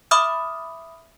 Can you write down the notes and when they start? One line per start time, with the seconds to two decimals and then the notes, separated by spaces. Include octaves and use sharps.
0.11 E5 B5 D6 D#6 F6